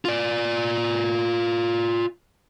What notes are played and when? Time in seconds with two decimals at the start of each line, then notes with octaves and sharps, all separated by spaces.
0.05 F4 D5